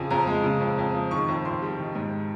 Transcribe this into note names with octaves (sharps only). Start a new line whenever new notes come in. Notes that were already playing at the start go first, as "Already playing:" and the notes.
Already playing: F2 C#3 G#5
F2 A#5
G#3
C#3
F2
F2
F3
D#3 C#6
F2
F2 C6
G3
D#3
G#2